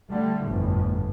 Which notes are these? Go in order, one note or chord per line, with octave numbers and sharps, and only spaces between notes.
D3 G3 A3
G1 F2 A2